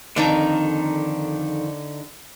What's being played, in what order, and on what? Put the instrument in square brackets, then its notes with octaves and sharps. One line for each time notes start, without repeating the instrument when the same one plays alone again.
[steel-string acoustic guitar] F2 D#3 A#5 [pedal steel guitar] D3 D4 D#4